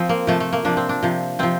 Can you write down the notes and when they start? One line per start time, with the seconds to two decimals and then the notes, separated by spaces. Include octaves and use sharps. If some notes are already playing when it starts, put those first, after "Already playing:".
Already playing: F3 C4
0.09 A#3
0.27 C3 F3 A3
0.40 A3
0.53 A#3
0.65 C3 F3 D4
0.77 C4
0.89 D4
1.03 C3 F3
1.39 C3 F3 C4